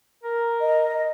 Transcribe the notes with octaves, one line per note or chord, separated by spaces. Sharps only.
A#4
D#5